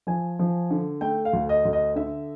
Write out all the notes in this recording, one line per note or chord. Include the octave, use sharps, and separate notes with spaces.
F3 G#5
F3
D3
A3 G5
F5
D2
D#5
D2
D#5
D3 E5